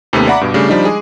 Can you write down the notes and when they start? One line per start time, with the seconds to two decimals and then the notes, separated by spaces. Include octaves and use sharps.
0.13 D#2 C3 A3 B3 C#4
0.27 D5 E5 F#5 A#5 B5 D6
0.41 G2 B2
0.54 C#3 G3 A3 D4
0.69 F3 G3 D4 D#4
0.85 G#3 G#4